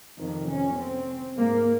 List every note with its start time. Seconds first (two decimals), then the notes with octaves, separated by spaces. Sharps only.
0.19 F2 C3 D#3
0.49 C#4
0.78 C4
1.37 G#2 A#3